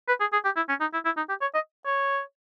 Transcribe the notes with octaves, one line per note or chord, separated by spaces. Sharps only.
B4
G#4
G#4
G4
E4
C#4
D#4
E4
E4
D#4
G4
C#5
D#5
C#5